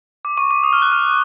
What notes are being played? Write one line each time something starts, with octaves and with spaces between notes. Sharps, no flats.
D6
C#6
D6
D#6
F6
F#6
F6